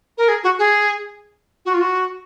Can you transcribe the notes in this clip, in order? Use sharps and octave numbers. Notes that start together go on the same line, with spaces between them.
A#4
G#4
F#4
G#4
F#4
F4
F#4